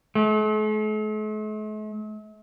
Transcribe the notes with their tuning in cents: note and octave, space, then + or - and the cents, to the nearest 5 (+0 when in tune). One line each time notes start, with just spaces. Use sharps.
A3 -45